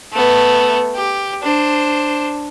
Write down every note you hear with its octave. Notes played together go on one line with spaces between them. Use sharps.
A3 B3
G4
D4 C5